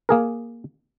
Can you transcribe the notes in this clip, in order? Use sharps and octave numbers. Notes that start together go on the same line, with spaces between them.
A#3 G#4 A#4